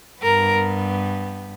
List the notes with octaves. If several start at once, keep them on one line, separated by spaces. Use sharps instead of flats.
G2 G3 B3 A#4